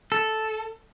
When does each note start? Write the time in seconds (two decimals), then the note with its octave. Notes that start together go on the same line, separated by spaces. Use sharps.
0.12 A4